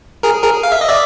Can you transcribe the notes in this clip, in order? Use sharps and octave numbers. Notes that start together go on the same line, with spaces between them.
G#4 A#4
G#4 A#4
F5
E5
D#5
D5 E5